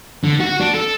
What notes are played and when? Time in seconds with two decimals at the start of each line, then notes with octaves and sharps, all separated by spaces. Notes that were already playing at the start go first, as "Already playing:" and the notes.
0.24 D3
0.40 F#4
0.61 D4
0.74 A4